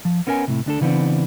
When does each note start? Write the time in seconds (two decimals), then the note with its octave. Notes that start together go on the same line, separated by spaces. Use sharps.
0.05 F3
0.27 B3 C#4 A#4 E5 G#5
0.48 A2 C3
0.66 D2 D4 A4
0.81 C#3 E3 B3 C4 D4